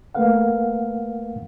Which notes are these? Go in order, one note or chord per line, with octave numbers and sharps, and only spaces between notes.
A3 A#3 A#4 B4 F5 F#5